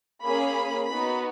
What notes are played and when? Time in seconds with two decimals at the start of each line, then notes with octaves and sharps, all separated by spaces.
0.24 A#3 C#4 G#4 B5
0.87 B3 D#4 F#4 B5